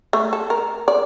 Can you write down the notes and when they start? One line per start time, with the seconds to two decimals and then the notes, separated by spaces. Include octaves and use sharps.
0.13 A3
0.33 A4
0.50 A#4
0.88 D5